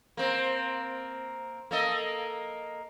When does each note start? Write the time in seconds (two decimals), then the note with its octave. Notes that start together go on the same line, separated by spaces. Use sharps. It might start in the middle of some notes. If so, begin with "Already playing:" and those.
0.17 A#3 C4
1.71 A#3 A4 D#5